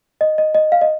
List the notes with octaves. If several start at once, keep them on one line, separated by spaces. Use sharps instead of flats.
D#5
D#5
D#5
F5
D#5